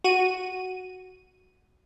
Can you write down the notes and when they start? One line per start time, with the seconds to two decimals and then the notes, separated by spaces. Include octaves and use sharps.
0.04 F#4 D#7